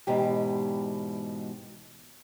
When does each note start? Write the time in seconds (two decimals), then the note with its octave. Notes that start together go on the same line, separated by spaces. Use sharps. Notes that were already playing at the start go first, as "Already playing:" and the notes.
0.07 E2 G#2 B2 G4